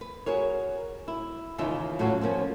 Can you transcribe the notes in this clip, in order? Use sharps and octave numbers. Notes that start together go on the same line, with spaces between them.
B4
F#4 G#4 A#4 C#5
E4
D#2 C#3 E3 D#4 F4 E5
A2 F#3 C#4 F4 F#4
F3 A3 A#3 C#4